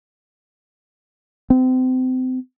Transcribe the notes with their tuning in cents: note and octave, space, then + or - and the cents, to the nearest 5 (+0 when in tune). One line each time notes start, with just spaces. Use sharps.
C4 -30